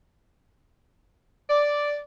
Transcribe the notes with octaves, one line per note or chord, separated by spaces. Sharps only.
D5